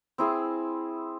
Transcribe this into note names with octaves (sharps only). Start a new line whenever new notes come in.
C4 E4 G#4